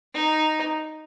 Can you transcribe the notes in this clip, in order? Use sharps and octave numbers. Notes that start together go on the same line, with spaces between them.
D#4